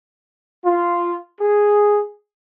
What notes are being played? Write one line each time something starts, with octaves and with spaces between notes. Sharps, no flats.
F4
G#4